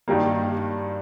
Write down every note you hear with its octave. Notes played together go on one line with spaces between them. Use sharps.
G2 D#3 G3 A#3